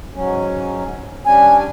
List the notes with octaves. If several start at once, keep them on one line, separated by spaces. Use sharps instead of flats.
G#2 F#3 C#4
G3 C#4 D4 G#5